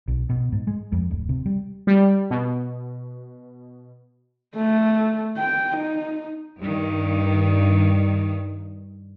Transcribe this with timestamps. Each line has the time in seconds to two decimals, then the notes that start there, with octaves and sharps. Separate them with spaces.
0.08 B1
0.30 B2
0.52 G#2
0.67 G#3
0.92 F2
1.11 D1
1.29 C3
1.46 G3
1.87 G3
2.31 B2
4.56 A3
5.37 G5
5.77 D#4
6.61 G2 D#3